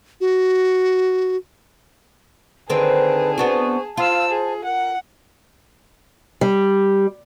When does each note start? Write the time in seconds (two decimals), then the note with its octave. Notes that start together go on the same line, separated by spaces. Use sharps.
0.21 F#4
2.70 D3 D#3 C4 G#4 B4 A5
3.38 B3 D4 F#4 C5 C#6
3.97 F4 C5 F5 A5 E6
4.30 G#4
4.64 A#4 F#5
6.41 G3